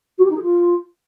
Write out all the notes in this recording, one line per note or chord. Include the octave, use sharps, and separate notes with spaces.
F#4
G4
D#4
G#4
F4